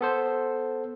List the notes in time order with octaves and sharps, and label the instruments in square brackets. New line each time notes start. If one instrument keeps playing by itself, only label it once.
[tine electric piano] B3 A4 C5